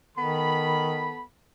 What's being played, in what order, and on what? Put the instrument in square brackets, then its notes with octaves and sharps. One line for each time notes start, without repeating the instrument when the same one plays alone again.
[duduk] D#3 [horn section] B3 A4 B5